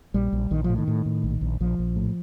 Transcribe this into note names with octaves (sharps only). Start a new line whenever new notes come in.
A#1 G3
A#1
A#1 D#3
F3
A2
D#3
A2
A2
A#1
A#1
A#1 F3
A#1
A2